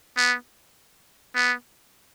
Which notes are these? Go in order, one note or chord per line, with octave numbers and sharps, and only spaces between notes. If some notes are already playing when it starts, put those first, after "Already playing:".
B3
B3